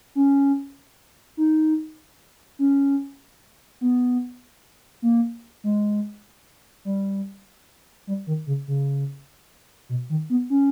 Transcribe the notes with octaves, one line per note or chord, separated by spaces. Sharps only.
C#4
D#4
C#4
B3
A#3
G#3
G3
G3
D#3
C#3
C#3
B2
D#3
B3
C#4